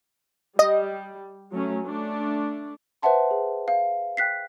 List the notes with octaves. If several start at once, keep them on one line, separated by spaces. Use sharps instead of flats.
G3 D#5
F#3 A3 C#4
A3 D4
B4 C5 E5 F#5 A5 C6
G#4
F5
G5 F#6 B6 C7